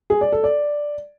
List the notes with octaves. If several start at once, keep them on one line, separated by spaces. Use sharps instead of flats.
G#4
D5
A4
D5